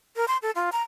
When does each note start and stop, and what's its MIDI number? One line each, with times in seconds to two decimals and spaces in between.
0.16 0.25 70
0.28 0.37 84
0.42 0.51 69
0.55 0.69 65
0.72 0.82 82